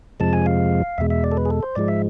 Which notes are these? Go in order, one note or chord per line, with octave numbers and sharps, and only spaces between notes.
F2 C3 F3 G#3 A5
G#5
F5
E2 B2 G#3 E5
E5
D5
A4
B4
G#4
A4
C5
G#2 F3 G#3 D5
E5